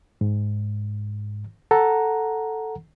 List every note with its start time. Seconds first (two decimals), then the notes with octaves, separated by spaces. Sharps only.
0.21 G#2
1.71 A4 F#5 A#5